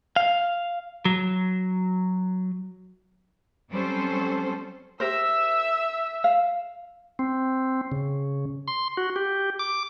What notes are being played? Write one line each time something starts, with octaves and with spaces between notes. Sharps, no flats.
F5
F#3
F#3 G3 C4 C#4 A4 C5
G4 A#4 C5 E5 E6
F5
C4
C#3
C6
F#4
G4
D6